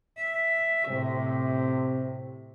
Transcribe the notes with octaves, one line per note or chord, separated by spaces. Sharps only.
E5
A2 C3